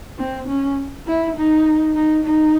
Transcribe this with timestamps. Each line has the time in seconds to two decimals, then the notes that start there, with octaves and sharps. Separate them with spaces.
0.19 C4
0.48 C#4
1.07 E4
1.36 D#4
1.95 D#4
2.25 D#4